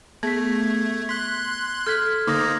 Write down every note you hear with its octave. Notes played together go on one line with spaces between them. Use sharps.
A3 B3 G#4 G#6 B6
C6 F#6 B6
A4 F6 G#6 B6
D3 A#3 D#4 C6 D#6 A#6